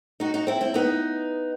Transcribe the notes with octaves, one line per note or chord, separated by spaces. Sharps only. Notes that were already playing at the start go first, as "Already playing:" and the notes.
D#4 F#4
D#4 F#4
C4 E4
C4 E4
B3 D#4